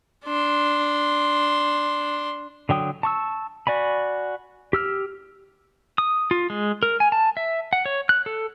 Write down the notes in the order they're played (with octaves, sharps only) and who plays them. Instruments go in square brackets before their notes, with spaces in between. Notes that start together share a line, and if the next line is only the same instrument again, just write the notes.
[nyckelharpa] D4 C6
[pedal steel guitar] D3 F#3 G5 D#6
A5 C#6 E6
F#4 D5 G#5 B5
G4 E6 F6
D#6
F4
G#3
A#4
G#5
A5
E5
F#5
C#5
F#6
A4